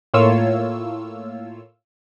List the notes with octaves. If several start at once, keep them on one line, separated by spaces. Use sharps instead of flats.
A2 A#3 F4 C#5 E6